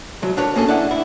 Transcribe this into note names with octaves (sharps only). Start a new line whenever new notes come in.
C2 F#3
D4 A#4 B4 C#5
A#3 C#4 G#4 A4
D4 E4 F#5
E4